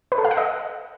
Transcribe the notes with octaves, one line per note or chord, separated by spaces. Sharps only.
B4
A4
F5
F#5
D#5